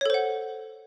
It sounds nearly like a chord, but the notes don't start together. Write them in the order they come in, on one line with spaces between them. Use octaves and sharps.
C#5 A4 C5 F#5